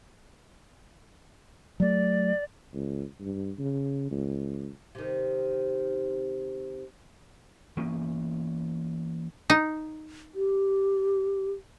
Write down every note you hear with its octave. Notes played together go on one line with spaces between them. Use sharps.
F#3 A3 D5
C#2
G2
C#3
C#2
C3 D#3
E3 A#3 B3 C#4
D#4
G4